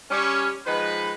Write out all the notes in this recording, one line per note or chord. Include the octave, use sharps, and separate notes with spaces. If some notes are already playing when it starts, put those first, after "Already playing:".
G3 C#4
D#3 F3 G#3 B4